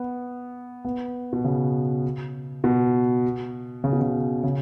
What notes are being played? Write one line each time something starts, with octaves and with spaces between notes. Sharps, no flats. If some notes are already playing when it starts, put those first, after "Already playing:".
Already playing: B3
B3
B2
C#3
B2
C#3
B2
C#3
C#3